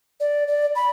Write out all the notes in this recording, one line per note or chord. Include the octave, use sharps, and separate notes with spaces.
D5
D5
B5